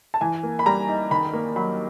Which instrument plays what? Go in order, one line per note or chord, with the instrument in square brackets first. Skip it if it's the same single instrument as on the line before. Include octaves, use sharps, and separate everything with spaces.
[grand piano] A5
[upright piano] E3 [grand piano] G#5
[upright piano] A#3
[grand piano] B5
[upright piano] G3 [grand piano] A#5
[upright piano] D#4
[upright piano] D#3 [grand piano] B5
[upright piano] A#3
[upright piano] F#3 [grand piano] B5